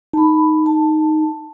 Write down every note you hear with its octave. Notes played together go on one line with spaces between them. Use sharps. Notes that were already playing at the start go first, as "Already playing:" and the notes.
D#4 A5 B5
A5